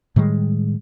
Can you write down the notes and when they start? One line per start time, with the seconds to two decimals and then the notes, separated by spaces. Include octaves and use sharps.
0.16 A2 D#3 G3 G#3